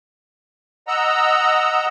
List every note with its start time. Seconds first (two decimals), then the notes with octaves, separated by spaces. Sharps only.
0.88 D#5 F#5 A#5 E6